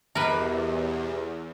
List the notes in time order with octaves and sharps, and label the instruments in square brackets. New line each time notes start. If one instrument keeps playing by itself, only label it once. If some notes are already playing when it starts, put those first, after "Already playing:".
[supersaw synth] E2 [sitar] G2 B2 A#3 [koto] A#4 B4